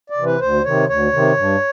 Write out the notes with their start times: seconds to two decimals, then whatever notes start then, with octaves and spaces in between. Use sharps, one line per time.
0.10 D5
0.17 C3 E3
0.25 B4
0.41 D2 C5
0.65 C3 D#3 C#5
0.89 D2 C#5
1.13 C3 D#3
1.37 G2